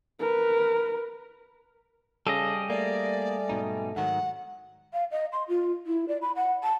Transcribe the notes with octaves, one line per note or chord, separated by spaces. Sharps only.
A#4 B4
C#3 G3 G#4 A4 D#5
A3 A#3 D5
G#2 B2 D#4
G#2 D#3 F#3 F#5
F5
D#5
C6
F4
E4
D5
B5
F#5
A5